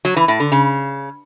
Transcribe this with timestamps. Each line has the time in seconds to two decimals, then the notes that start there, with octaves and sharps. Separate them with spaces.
0.05 F#3
0.16 E3
0.28 A2
0.40 D3
0.52 C#3